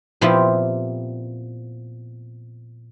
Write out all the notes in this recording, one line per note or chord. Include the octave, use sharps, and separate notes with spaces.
A#2 F3 B3 C4 E4 G4